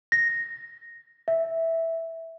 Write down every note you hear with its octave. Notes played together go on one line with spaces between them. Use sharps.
A#6
E5